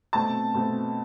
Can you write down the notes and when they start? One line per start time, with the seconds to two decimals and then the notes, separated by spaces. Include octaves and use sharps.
0.13 B2 A3 C4 A5
0.54 B2 A3 C4